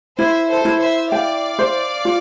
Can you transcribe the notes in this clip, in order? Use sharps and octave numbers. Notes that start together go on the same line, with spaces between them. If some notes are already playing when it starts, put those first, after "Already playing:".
E4 C5 E5
A4 C5
E4
C5 E5
D5 F5 G5
C5
F4